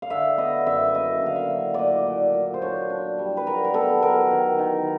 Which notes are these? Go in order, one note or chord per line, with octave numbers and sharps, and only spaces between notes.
F5
D3 E5
B3 D#5
F#2 E5
A#3 D#5
D3 F5
E5
F#3
A#2 D5 D#5
A#2
A#2
C5
D4 C#5
D4
G3
B4
F#3 A#4
A#4
B3 A4
B3 A#4
D#3
D#3